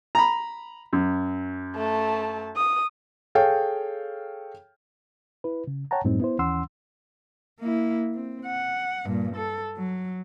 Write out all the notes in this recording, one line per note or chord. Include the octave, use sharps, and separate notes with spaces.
A#5 B5
F#2
A3 A5
D#6
G#4 A4 C#5 F5 G5
E4 B4
C#3
C#5 F#5 G5 A5 A#5
F#2 A2 G3 C4 D#4
B3 E4 C5
D#2 E3 C#4 F#5 C6 E6
A#3 E4
C4
F#5
G2 A#2
A4
F#3